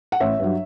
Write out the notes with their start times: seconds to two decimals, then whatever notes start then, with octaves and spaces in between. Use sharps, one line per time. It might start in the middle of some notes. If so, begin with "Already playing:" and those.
0.12 F#5
0.20 A1 C#5 E5
0.40 G2 F#3